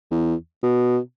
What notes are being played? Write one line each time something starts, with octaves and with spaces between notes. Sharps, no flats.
E2
B2